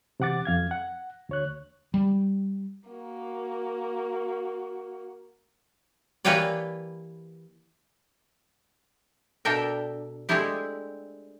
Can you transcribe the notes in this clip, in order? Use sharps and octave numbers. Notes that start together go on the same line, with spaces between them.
C3 E3 F#5 D6 A6
F2 F5 G#6
F#5
D2 C#5 F#6
G3
A#3 F#4
E3 A#3 G4 B4 C#5 D5
B2 D4 A4 A#4 E5 G5
G#3 A3 C4 D4 E4 G4